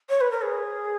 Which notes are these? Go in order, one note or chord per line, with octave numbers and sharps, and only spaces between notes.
C#5
B4
A#4
G#4